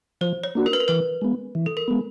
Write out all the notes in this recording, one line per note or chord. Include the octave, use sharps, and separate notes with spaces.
F3 C5
C#5
A#3 D4 F#4
A#4
B4
A#4
E3 B4
G#3 B3
E3
A4
A#4
G#3 B3